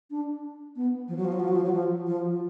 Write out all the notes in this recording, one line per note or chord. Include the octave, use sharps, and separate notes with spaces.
D4
B3
F3
F#3
F3
F#3
F3
F#3
F3
F#3
F3
F3